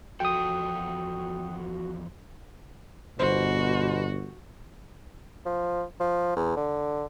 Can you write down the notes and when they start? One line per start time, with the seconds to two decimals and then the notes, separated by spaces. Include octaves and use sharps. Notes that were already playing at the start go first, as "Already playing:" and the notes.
0.20 E2 F3 F#4 A4 G5 D#6
3.19 G1 B2 F#4 C5
5.46 F3
6.00 F3
6.36 E2
6.56 D3